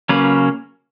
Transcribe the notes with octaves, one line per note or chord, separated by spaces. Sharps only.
C#3 F#3 A#3 C#4 B4